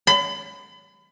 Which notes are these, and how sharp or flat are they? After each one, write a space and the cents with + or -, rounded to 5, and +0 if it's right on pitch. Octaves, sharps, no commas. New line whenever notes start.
B5 +35